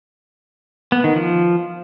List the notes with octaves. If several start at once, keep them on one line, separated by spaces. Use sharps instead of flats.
B3
D#3
F3